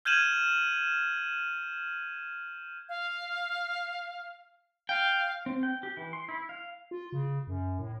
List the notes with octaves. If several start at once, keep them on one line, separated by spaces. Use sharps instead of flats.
F6 G6 G#6 D#7 E7 F#7
F5
F5 G5
C4
G5
G4
E3
C6
E4
F5
F4
C#3
F#2
A2